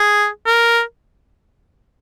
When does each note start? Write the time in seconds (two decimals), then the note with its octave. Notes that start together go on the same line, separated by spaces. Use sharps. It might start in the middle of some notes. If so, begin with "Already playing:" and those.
Already playing: G#4
0.46 A#4